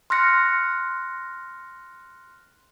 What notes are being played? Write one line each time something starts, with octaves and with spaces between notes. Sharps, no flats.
C6 F6 F#6 A#6 C#7